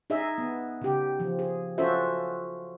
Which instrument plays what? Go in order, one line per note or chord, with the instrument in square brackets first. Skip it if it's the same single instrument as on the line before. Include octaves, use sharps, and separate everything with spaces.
[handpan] D#4 G#4 D#5 E5
B3
C#3 G4
F3
G#4
C#4 F4 F#4 A4 C5 E5